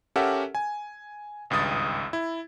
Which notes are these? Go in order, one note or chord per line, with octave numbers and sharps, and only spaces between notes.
C#4 G4 A4 A#4 E5 F#5
G#5
G#1 C#2 G2 D#6 A6
E4